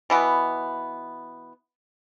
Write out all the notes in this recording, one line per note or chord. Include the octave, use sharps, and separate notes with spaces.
B2 E3 B3